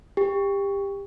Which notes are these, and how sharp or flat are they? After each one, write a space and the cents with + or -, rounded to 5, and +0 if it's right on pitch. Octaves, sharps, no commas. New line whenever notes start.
G4 +25